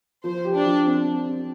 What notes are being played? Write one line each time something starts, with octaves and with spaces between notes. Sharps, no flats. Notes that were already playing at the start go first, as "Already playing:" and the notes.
F3 C5
G4
D4
F3
C4